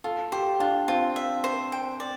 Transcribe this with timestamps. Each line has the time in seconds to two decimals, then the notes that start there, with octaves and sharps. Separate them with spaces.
0.04 F4 A4
0.32 G4 C5
0.60 D4 F4
0.88 C4 F4
1.16 E5
1.44 C5
1.72 G5
2.00 D5